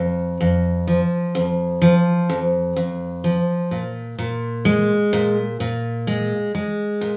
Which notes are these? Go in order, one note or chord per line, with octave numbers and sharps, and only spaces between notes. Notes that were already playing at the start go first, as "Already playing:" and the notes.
Already playing: F2
F2
F3
F2
F3
F2
F2
F3
A#2
A#2
G#3
A#2
A#2
G#3
G#3
A#2